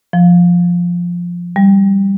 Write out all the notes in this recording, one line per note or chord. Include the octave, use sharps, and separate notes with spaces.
F3
G3